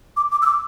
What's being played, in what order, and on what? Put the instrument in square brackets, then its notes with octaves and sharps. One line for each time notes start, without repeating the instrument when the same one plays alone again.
[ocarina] D6
D6
E6
D6